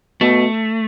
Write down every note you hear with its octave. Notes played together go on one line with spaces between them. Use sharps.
B2 A3